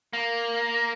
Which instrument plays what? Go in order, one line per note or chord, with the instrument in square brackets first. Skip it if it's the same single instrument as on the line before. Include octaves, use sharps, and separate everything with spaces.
[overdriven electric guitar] A#3